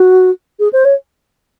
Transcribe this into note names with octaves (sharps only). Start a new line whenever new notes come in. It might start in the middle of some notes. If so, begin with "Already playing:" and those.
Already playing: F#4
G#4
C5
C#5